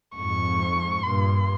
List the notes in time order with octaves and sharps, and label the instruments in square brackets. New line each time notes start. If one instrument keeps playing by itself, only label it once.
[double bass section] F2 G#2 [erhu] C#6
[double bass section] G2 A#2 [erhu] C6